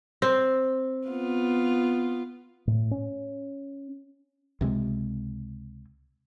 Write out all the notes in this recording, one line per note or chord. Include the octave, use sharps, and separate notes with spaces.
C4
B3 F4
A2
C#4
C#2 C3 F3 G#3